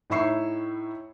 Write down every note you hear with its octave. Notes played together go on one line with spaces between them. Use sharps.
A2 D#4 E4 E5 C#6 C7